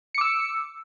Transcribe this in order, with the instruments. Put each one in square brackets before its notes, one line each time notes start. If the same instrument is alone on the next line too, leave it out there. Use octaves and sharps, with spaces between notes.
[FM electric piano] C#7
D6
E6